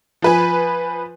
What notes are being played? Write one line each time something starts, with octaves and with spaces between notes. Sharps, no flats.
F3 B4 G#5